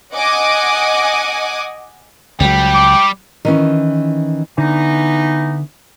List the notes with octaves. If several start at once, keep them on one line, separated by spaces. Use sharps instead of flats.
D#5 F#5 G#5 D6 D#6
C#2 F#3 G3 G5
D6
D#3 E3 C#4
D3 E3 B3 D#4